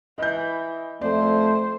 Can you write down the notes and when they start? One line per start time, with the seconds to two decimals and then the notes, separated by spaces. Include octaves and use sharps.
0.18 E3 D#5 G6
1.01 F2 A3 C5 D5